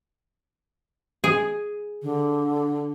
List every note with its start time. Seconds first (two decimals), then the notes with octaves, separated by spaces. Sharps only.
1.24 G#4
2.02 D3